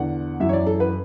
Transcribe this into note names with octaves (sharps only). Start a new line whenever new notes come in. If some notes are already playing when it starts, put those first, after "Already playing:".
Already playing: E2 D3 F#5
F#2 E3 E5
C#5
D5
A4
B4